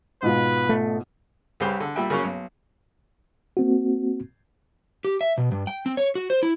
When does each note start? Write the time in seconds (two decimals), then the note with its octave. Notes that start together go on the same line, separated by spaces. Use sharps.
0.23 G#2 B2 F4 B4
0.69 A3
1.60 C2 C#3 G4 B4 C5 C6
1.80 D3
1.95 A#2 G3 E5 G5
2.10 C#3 F#3 A#3 C#4
2.24 B1
3.57 A#3 C4 F#4
5.05 G4
5.21 E5
5.38 B2
5.52 G2
5.67 G5
5.86 C4
5.97 C#5
6.15 F#4
6.30 C5
6.43 E4